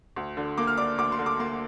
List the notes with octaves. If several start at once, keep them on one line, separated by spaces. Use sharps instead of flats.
D2
D3
A#3 D6
F6
D4 D6
D2 D6
C6
D3
D6
A#3 C6